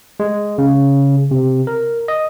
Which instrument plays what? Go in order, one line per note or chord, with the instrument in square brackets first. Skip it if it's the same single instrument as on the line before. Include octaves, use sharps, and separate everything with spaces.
[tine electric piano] G#3
C#3
C3
A#4
D#5